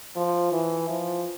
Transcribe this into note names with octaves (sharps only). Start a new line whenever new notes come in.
F3
E3
F3